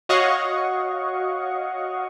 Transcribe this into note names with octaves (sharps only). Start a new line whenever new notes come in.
F#4 C#5 D#5 F5 F#5 C#6